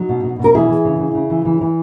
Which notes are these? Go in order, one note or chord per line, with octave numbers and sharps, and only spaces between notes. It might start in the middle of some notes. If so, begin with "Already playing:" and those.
Already playing: F#3 D#4
B2
B2
B2 A#4
E3 E4 G#4
E3
C#3
C#3
C#3
E3
E3
E3